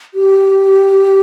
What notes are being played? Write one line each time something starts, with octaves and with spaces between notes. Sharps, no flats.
G4